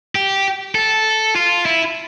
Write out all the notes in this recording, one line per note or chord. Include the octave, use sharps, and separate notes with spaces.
G4
A4
F4
E4